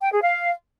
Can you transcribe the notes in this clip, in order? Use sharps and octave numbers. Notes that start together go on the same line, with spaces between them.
G5
G#4
F5